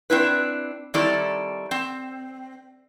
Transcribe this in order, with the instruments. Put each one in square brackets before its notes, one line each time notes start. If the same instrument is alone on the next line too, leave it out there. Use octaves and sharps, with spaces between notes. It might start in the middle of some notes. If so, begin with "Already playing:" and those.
[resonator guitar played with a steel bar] C4 D4 E4 B4
D#3 G3 C4 E4 A4 D5
C4